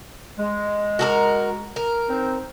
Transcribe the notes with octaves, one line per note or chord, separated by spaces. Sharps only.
G#3
F#4 A4 A#4
A#4
C4 D#4